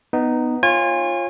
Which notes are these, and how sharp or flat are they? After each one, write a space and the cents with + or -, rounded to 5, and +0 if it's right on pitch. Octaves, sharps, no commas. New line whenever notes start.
B3 +10 D#4 -10
F4 +0 C#5 -30 G#5 -30